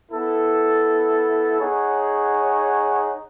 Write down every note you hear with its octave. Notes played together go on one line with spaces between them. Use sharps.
B3 E4 A4
D#4 G#4 C#5 F#5